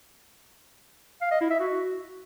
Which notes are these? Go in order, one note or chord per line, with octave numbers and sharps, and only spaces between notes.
F5
D#5
E4
E5
F#4